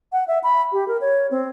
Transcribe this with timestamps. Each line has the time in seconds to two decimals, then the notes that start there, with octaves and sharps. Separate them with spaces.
0.13 F#5
0.28 E5
0.43 B5
0.72 G4
0.88 A#4
1.01 C#5
1.31 C4